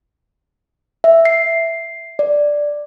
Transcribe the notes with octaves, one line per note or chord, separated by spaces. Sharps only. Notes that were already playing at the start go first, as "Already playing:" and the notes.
E5
C7
D5